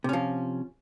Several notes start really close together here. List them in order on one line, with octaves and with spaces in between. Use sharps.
C3 C#4 F3